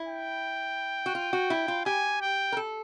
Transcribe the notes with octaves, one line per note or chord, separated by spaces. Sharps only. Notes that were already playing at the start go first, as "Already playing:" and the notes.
Already playing: E4
G5
F#4
F4
F#4
E4
F4
G4 G#5
G5
A#4
A4